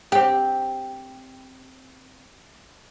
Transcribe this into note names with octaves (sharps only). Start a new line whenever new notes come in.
C4 G4